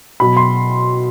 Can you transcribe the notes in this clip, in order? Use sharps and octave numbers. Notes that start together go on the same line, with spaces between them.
B2 F#3 B5
C6